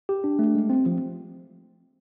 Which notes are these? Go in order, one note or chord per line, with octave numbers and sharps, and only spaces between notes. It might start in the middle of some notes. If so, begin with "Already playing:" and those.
G4
D4
A3
G#3
C4
F3